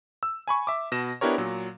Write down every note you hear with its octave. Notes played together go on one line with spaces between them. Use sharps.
E6
G#5 B5 C#6
E5 D6
B2 A#6 E7
B3 D4 E4 G4 A#4 C#5
A#2 F#3